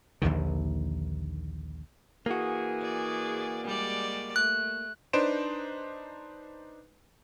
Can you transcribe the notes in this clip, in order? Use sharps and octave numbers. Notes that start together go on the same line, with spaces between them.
A#1 D#2 D3 D#3
E3 A#3 F#4 G#4
D5
G3 G#3 D5
A3 F#6
D4 D#4 B4 C5 D7 E7